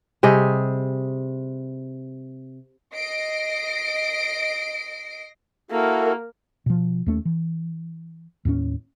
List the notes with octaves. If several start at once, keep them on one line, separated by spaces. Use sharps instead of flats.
C3 G3 G#4 D#5
D#5 A#6 C7 D7
A#3 E4 F#4 A4 A#4
B2 F3
D#2 A3 C#4
E3
D#2 A2 G3 C#4